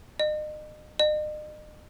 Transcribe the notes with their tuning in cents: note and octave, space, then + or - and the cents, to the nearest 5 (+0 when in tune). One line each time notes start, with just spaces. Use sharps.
D#5 -35
D#5 -40